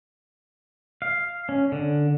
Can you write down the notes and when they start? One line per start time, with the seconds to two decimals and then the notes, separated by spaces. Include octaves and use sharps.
1.02 F5
1.49 C#4
1.72 D3